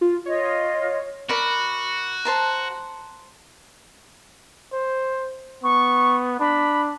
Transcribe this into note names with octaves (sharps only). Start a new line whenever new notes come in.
F4
F4 C#5 D#5
F#4 A#4 D5 B5
C5 A5 A#5
C5
B3 C#6
D4 B5